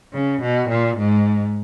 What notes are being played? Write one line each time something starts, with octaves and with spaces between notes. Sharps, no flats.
C#3
B2
A#2
G#2